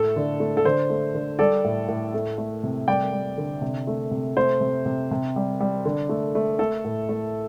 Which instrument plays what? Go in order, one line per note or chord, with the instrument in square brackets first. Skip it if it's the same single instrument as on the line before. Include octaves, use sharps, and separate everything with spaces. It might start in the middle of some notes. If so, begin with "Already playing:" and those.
Already playing: [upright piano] A2 A3 A4
D3
A3
A4
D3 C5
A3
D3
G3 A4 D5
A2
A2
A3
A3
C3
G3 D5 G5
G3
D3
C3
A3
C3
A3 C5
C3
C3
C3
G3
G3
D3
A3
A3
A3 A4
A2
A3